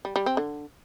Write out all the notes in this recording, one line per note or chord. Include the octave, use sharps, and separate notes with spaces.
G3
G3
C4
D3